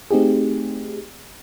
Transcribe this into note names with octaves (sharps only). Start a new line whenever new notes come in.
A3 C4 D#4 G4 G#4